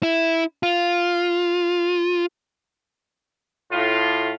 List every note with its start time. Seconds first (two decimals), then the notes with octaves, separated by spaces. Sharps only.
0.03 E4
0.63 F4
3.72 A2 F4